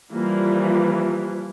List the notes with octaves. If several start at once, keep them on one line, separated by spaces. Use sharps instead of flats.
E3 F3 G3 A#3 F4